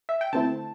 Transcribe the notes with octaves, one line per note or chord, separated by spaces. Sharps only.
E5
G5
D3 A3 C4 E4 A5